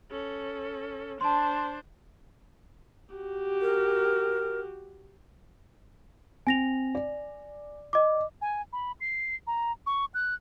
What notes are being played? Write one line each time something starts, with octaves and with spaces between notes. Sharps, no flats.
C#4 A4
D4 C5 A5 C6
F#4 G4
A#4
C4 G#5 A#6 F7
D5
D#5 D6
G#5
B5
C7
A#5
C#6
F#6